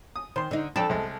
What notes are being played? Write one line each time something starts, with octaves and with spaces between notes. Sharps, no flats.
D#6
D#3 C5 C6
D3 D#4
F2 D4 A4 G5
C2 G#3